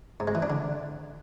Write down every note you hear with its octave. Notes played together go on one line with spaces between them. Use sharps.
G#2
G#3
E3
D4
D3